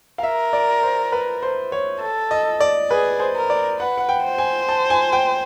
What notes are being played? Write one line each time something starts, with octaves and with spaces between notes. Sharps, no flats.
F5
A#4 E5
D5
C5
B4
C5
C#5
A4
D#5
D5
G#4 B4
C5
A#4
D5
B4 F#5
F#5
G5
C5
G#5
A5
G#5
G5